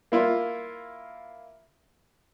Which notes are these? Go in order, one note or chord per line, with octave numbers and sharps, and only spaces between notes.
A#3 E4 F4